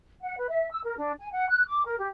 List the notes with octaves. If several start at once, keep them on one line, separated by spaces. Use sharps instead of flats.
F#5
B4
E5
E6
A#4
D4
G#5
F#5
F#6
D6
A#4
G4